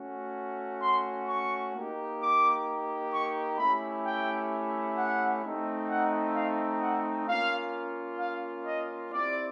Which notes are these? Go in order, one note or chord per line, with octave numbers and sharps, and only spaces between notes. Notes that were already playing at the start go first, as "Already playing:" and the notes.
Already playing: A3 C#4 F#4
C6
C#6
A#3 D#4 G4
D6
C#6
A3 C#4 E4 G4 B5
G5
F#5
A3 C4 D#4
F#5
F5
F#5
A#3 C#4 F4 F5
F5
D#5
C4 E4 G4 D5